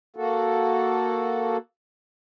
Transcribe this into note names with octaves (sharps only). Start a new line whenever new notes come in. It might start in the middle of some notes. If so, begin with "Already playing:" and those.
A#3 F#4 A4